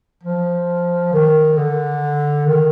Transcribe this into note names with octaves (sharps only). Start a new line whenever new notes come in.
F3
D#3
D3
D#3